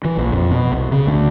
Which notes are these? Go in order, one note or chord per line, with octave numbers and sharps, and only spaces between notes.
E3
A#1
F2
B2
C2
C#3
D2